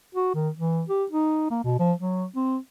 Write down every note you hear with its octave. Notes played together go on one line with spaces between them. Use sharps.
F#4
D#3
E3
G4
D#4
A#3
B2
F3
F#3
C4